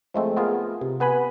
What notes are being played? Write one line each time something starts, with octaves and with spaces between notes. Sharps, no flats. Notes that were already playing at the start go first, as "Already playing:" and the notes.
F3 G#3 A3 C4
B3 F4 G#4 A#4
C3
B3 B4 G#5 B5